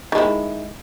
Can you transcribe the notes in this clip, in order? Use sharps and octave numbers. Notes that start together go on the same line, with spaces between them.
D#3 G#3 E4